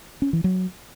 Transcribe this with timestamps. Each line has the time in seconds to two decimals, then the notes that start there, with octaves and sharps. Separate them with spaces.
0.22 C#4
0.33 E3
0.44 F#3